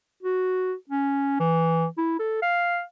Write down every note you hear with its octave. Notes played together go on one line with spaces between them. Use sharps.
F#4
C#4
E3
E4
A4
F5